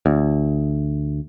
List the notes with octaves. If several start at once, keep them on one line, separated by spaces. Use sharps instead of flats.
D2